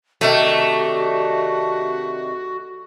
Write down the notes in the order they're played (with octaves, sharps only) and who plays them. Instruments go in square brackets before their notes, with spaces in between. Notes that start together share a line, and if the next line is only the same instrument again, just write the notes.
[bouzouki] C3 D#3 D4 [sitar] A3 [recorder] F#4